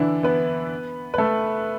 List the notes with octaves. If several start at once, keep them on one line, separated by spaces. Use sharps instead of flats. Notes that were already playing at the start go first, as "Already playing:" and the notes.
Already playing: D3 E3 D4 E4
B3 B4
B4
A3 A4